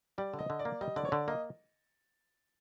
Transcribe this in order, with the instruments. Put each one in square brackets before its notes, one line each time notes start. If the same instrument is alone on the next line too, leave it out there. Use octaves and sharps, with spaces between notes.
[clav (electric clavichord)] G3 [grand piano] D5
[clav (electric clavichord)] D3
[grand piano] D#5
[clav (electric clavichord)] D3
[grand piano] D5
[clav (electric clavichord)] A#3
[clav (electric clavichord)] G3 [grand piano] D#5
[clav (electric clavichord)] D3 [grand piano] D5
[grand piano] C#5
[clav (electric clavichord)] D3 [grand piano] D5
[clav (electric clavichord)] A#3 [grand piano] D#5